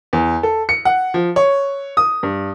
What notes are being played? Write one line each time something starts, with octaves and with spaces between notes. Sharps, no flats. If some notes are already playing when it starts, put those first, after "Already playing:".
E2
A4
C#7
F#5
F3
C#5
D#6
G2